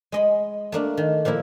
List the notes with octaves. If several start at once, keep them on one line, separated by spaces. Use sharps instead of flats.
G#3 D#5 B5
A3 A#3 D4
D#3
A#2 F3 A#3 E4